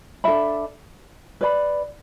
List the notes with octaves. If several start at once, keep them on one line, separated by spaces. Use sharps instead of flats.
D4 A4 E5 B5
B4 D5 B5